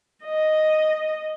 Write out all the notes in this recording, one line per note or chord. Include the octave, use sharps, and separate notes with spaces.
D#5